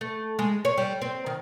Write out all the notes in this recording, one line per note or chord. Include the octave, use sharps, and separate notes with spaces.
A3
G#3
C#5
G3
C4
D#3